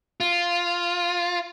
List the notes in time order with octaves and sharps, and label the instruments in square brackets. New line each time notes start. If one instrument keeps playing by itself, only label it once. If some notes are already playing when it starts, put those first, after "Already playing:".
[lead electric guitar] F4